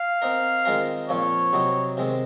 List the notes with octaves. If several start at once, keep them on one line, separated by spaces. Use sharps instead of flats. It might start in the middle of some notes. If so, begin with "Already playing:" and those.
Already playing: F5
C4 D#4 A#4
D#3 G#3 C4 F4 A#4
A#2 F3 C4 F4 C#5
C3 F#3 C4 D#4
C3 D#3 G#3 C4